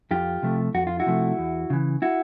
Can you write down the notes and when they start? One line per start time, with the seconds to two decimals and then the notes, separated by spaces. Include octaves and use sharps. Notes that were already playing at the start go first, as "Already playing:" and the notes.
0.11 F2 F4 G4
0.43 C3 F3 A3
0.74 F2 F#4
0.87 F4
0.99 E4 F#4
1.06 C3 F3 A3
1.39 E2
1.70 C#3 E3
2.02 E4 F#4